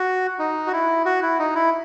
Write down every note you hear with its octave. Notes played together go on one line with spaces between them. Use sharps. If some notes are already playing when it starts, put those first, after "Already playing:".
Already playing: F#4
D#4
F#4
E4
F#4
E4
D#4
E4